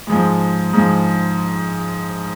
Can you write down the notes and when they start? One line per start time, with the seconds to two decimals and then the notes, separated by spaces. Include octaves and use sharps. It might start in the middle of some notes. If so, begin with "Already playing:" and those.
0.07 G#2 F3 G#3
0.73 G#2 F3 G#3